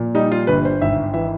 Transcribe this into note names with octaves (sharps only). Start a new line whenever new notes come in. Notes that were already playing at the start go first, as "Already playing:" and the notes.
Already playing: A#2 F3
G3 D#4
F4
G1 B4
C5
G#1 E5
E3 E5